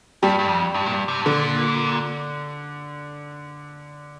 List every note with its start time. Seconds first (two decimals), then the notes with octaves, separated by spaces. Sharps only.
0.23 G2 G3
0.39 G2
0.48 F2
0.74 G2
0.86 A#2
0.91 G2
1.08 C3
1.21 G2
1.26 A#2 D3